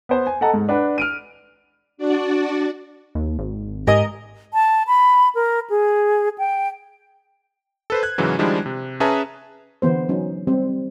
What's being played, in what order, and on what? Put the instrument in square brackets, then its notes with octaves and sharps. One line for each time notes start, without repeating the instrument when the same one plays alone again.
[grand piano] B3 C5
G#5
A4 D#5 F#5 A5 A#5
G#2
D4 B4 F#5
F6 D7 D#7
[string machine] D4 F#4 D5
[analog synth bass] D#2
G#1
[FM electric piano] G#2 G4 G#5 [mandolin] A#4 D#5
[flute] A5
B5
A#4
G#4
G5
[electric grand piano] A4 B4 C5
F#6 G#6
G#2 C#3 E3 F#3
D#3 F3 G3 G#3 D4 E4
C3
C#4 G#4 B4 E5 A5 A#5
[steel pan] D3 E3 B3 C5
F#3 C#4 D#4
G3 C4 G4 C5